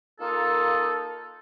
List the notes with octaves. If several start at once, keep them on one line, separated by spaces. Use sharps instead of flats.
A#3 D#4 F4 A4